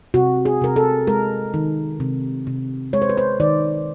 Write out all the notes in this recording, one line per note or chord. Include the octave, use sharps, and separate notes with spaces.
C3 F#4
G#4
C3 A#4
A4
G#3 A#4
D#3
C3
C3
G#3 C#5
C5
B4
C5
D#3 D5